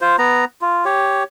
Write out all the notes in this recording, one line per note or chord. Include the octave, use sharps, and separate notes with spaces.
F4 C5
B3 A#5
F4
G4 C#5